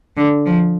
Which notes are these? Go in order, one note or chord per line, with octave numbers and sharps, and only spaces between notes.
D3
F3